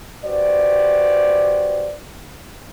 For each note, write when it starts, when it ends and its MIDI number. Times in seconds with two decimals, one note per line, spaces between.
0.24 1.93 66
0.24 1.93 67
0.24 1.93 71
0.24 1.93 72
0.24 1.93 74